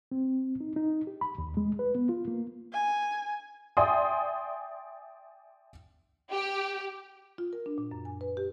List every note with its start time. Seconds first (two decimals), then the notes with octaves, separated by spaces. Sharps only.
0.12 C4
0.61 D#4
0.76 D#4
1.07 G4
1.21 B5
1.38 D#2
1.57 G#3
1.79 B4
1.95 B3
2.09 F4
2.28 A#3
2.72 G#5
3.77 D5 E5 G5 G#5 C6 D#6
6.31 G4
7.38 F4
7.53 A#4
7.66 D4
7.78 A#2
7.91 F#2
8.05 G#5
8.21 B4
8.37 G4